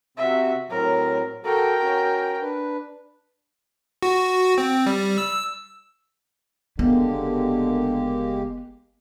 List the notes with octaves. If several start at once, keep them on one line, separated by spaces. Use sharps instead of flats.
C3 C4 F#4 E5
A2 F#3 C4 A#4
F#4 A4 A#4 G5
C#4 F#4
D4 B4
F#4
C4
G3
E6
F#1 D3 G#3 A#3 B3 G4